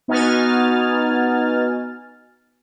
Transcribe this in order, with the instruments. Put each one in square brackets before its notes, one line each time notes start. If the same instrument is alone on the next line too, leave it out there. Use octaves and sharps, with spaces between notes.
[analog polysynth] B3 D#4 F#4 G#5 F6 A6